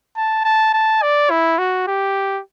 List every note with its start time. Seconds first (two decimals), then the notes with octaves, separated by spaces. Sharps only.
0.16 A5
0.44 A5
0.74 A5
1.02 D5
1.30 E4
1.58 F#4
1.87 G4